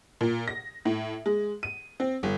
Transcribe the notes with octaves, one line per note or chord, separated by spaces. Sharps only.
A#2
A#6
A2
G#3
D#7
C4
G1